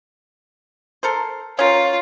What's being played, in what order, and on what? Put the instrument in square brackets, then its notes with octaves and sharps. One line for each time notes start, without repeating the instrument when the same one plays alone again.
[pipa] A4 A#4 C5
[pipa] C#4 A#4 [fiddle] F4 [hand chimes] C#5